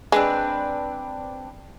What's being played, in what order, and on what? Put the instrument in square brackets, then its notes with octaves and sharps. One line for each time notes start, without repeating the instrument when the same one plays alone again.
[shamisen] G#3 [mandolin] C4 D4 B4